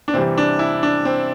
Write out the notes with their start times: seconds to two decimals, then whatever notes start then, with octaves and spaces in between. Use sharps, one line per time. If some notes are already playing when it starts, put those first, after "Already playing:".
0.08 D4
0.14 C3 E3 G3 C4
0.38 D4
0.59 E4
0.83 D4
1.05 C4